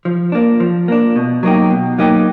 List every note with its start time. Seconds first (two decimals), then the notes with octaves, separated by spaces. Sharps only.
0.05 F3
0.32 A#3 D4
0.60 F3
0.88 A#3 D4
1.16 B2
1.43 F#3 A#3 D#4 G4
1.70 B2
1.98 F#3 A#3 D#4 G4